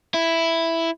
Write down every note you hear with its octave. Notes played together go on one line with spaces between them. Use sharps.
E4